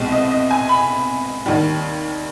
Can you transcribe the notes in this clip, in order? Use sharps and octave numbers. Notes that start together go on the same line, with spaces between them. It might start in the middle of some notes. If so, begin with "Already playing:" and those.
Already playing: C2 B2 G#3 C4
D#5
D#5
G#5
B5
D#2 D#3 G3